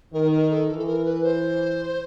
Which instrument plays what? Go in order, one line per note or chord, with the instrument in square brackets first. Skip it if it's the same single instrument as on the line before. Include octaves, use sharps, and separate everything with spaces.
[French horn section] D#3 [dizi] A#4
[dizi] A#4
A4
[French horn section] E3 [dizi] A4
[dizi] A4
A#4
B4
C5